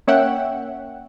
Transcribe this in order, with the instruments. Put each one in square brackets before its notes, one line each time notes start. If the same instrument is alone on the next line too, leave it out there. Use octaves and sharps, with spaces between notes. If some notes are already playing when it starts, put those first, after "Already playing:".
[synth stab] A#3 C#4 C#5 E5 F#5 G5